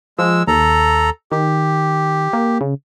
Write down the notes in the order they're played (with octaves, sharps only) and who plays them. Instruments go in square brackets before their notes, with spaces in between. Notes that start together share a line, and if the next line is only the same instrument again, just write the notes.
[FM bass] F3 [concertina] G#3 E6
[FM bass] D#2 [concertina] A4 A#5
[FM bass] D#3 [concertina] G4
[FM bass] A#3
C#3